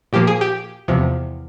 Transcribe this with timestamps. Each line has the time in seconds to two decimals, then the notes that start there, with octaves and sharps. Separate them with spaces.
0.13 A#2 F3 A#3 G4
0.27 G#4
0.41 G4
0.88 E2 C3 F3